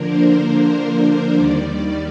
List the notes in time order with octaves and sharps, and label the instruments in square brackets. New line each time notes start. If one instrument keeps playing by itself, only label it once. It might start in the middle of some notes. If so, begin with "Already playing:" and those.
Already playing: [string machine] D3 F3 A#3 D4 A#4
C5
C5
D#2 D#3 G3 D5